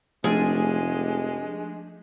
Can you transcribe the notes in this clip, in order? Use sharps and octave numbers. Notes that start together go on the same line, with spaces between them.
F1 F3 G#3 A3 D4 G#4 G#5